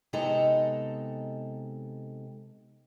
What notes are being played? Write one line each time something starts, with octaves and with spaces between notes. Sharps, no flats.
C3 G#3 B3 D#4 A4 A#5